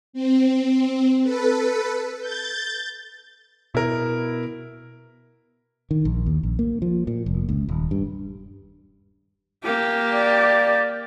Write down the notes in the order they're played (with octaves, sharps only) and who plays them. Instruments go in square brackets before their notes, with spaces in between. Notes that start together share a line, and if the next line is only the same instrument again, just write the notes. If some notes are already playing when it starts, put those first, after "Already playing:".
[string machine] C4
A4 B4
G6 A6
[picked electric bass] B2 [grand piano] E4 A#4
[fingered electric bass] D#3
A#1
D#2
A#1
A#3
F3
A#2
F1
C#2
D#1
G2
[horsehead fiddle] A#3 G4
[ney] D5